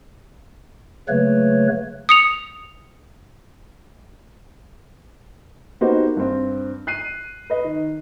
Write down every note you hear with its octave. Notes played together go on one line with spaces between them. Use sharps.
C#3 F#3 A3 A#3 B4 C#5
D#6 C#7 F7
A#3 B3 D#4 F#4 G4 C5
G2 C4
F#6 C7 D#7
B4 D#5
D#3